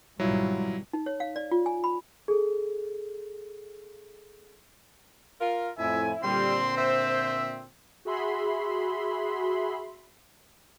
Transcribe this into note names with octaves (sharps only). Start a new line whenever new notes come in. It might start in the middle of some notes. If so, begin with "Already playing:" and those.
G#1 B2 F#3 G3 E4 F4
D#4
C#5
F5
D5
F4
G#5
B5
G#4 A4
F4 A#4
F2 A2 E4 E5 G#5
A#2 D3 G3 C4 C6
C5 E5
F#4 G#4 E5 B5 C6